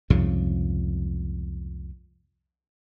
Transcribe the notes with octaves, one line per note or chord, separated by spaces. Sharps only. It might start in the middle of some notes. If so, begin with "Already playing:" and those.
C2 F2 G#2 C#3